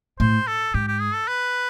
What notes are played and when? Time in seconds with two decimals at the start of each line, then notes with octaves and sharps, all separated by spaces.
0.20 A2 C5
0.47 A4
0.74 G#2 G4
0.88 G4
1.00 G#4
1.14 A4
1.28 B4